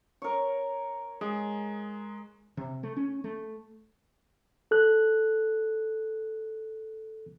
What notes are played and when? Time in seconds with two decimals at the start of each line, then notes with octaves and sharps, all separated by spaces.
0.22 A#4 C#5
1.21 G#3 G#4
2.57 C3
2.83 A3
2.96 C#4
3.24 A3
4.71 A4 F#6